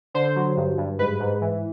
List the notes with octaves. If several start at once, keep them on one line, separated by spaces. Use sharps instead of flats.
D3 C5
F#3
G2
G2
G#2 B4
G#2
E3